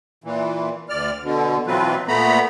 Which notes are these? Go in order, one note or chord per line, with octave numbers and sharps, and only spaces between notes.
A#2 E3
D2 D5 F6
B2 D3
B2 E3 F#3 C4 F4 B4
A#2 A3 B3 A#5 B5